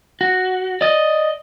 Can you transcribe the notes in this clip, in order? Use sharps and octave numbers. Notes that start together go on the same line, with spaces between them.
F#4
D5 D#5